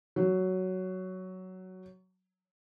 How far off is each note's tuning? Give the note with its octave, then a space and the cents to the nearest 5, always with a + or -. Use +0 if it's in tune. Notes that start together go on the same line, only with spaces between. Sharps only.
F#3 +10